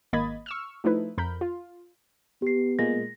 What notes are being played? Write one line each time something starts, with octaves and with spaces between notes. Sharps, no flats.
G#1 A#3 D#5 B5 G#6 A6
C#6 E6 F6
F3 A3 D#4 E4 B4
F2 A#4 B5 G6
F4
B3 G4 C7
A#2 G#3 A#3 A#6